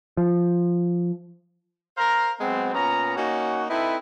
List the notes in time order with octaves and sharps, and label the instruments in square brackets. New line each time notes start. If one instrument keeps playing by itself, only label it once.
[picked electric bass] F3
[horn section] A#4 C5 F5 A#5
F#3 G#3 B3 C4
A#2 B3 C#4 A#5
A#3 C#4 D#4 F#4
C4 D#4 E4 A4 B4 E5